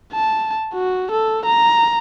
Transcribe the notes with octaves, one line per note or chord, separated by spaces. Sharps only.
A5
F#4
A4
A#5